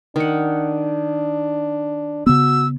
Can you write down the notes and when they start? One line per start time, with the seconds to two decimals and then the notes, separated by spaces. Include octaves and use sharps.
0.16 D#3 D4 F#5
2.27 C#3 B3 F#4 E6